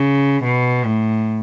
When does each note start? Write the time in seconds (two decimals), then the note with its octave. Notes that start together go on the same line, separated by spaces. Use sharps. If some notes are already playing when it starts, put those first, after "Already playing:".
Already playing: C#3
0.44 B2
0.85 A2